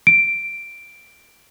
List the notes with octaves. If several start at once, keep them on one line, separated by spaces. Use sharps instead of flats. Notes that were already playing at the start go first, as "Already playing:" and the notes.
D7